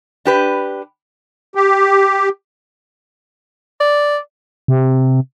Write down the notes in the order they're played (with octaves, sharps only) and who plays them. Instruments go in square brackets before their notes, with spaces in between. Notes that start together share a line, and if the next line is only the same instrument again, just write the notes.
[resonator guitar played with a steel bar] D4 G4 B4
[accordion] G4
[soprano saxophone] D5
[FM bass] C3